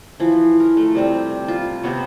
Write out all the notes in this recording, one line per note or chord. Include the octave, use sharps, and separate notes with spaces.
E3 F3
A#4
A3
C3 G3 C4
F4
C3 B3 C#5